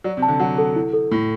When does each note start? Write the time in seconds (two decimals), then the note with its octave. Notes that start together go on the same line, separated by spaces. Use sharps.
0.04 F#3 D5
0.17 C3
0.22 A5
0.28 D3
0.40 F#3 F#5
0.58 A4
0.76 E4
0.93 A4
1.11 A2 E4